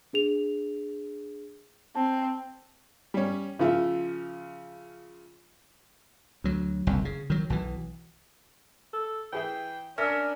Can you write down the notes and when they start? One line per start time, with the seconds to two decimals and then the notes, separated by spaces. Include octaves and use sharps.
0.13 D4 G#4 F7
1.96 C4 A5
3.14 G3 C#4
3.59 C#3 F3 F4 E5
6.44 D2 F#3
6.87 F#1 C2 F2
7.05 C#3
7.30 D#3 F#3
7.50 B1 B2 E3
8.93 A4
9.33 E3 G#4 E5 G5
9.98 C#4 D4 A#4 E5 E6